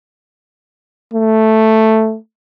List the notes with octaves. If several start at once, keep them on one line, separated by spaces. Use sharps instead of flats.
A3